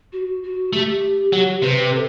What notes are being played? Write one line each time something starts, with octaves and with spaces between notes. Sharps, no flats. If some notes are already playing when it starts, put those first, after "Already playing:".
F#4
F#4
A3 G4
F#3
C3 B4
A4